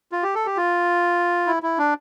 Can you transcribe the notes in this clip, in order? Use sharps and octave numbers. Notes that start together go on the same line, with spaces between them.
F4
G4
A4
G4
F4
E4
E4
D4